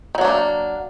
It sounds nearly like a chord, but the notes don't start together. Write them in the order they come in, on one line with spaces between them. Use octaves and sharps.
D#3 F#3 D4 A3 A#3